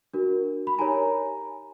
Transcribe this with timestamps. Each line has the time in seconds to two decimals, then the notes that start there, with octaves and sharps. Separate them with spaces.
0.14 D4 F#4 A#4
0.67 B5
0.78 D#4 G4 A#4 C#5 G#5 A#5